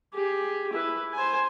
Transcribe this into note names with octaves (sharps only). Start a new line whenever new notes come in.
G4 G#4
E4 B4
C5 G#5